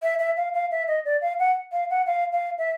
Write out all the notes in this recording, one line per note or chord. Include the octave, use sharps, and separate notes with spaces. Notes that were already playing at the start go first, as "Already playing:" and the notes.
E5
E5
F5
F5
E5
D#5
D5
F5
F#5
F5
F#5
F5
F5
E5